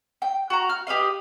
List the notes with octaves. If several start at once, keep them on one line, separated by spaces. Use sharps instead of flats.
G5
F#4 A#5
F6
G4 B4 D#5 F5